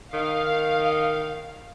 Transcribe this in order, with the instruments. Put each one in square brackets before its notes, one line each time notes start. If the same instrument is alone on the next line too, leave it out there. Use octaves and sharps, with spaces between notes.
[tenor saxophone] D#3 [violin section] F5